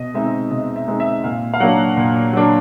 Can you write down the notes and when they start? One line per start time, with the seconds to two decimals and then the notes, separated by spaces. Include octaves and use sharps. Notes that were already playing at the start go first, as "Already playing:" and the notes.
Already playing: B2 D#5
0.14 G#3 C4 D#4 E5
0.51 B2 D#5
0.76 E5
0.88 G#3 C4 D#4
1.00 E5
1.24 A#2 F5
1.54 F5
1.60 F#3 A#3 D4 F#5
1.97 A#2
2.33 F#3 A#3 D4